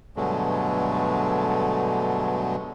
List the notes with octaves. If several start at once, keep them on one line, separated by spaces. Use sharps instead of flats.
G2 B2 D3 F#3 G#3 A3